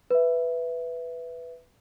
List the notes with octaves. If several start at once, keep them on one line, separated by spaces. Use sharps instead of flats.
B4 E5